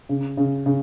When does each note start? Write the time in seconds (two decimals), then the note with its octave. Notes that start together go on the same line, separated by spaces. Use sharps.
0.09 C#3
0.37 C#3
0.66 C#3